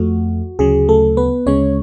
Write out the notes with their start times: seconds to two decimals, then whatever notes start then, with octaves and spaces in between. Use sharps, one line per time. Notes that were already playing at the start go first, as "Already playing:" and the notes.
Already playing: F2 F3 A3 F#4
0.59 D2 C#3 F#3 G#4
0.89 A3 A4
1.17 B3 B4
1.46 D2 C#3 G#3 C#4 C#5